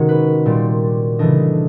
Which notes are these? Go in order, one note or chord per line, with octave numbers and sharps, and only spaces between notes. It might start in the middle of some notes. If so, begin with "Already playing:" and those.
Already playing: C3 D#3 G#3 C#4 F#4
B4
A#2 G3 C4 D5
C#3 E3 A3 D4 D#5